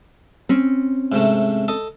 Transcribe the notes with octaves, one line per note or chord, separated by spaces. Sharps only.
C4 C#4
G#2 C3 A3
A4 D#5